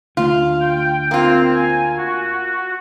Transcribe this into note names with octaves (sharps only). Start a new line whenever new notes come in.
D2 A3 F4
G5
A#3 C4 F4
G#5
F#4